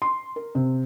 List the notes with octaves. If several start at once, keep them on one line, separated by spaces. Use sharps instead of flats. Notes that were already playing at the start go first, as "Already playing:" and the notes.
C6
A#4
C3